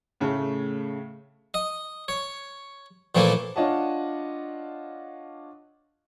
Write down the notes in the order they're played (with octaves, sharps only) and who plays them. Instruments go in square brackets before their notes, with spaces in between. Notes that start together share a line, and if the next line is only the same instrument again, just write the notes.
[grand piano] A2 C#3 A3
[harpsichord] D#5
C#5
A#2 E3 F3 A3 A#3
[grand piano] D4 F4 C#5 D#5 F#5 A5